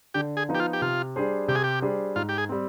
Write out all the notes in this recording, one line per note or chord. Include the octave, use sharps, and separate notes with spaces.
D3 G4
G#4
F3 B3 D#4
G4
F4
G4
C3 F4
G3 D4 G#4 C5
C3 G4
G#4
G4
G3 D4 G#4 C5
G#2 F4
G4
G#4
G3 C4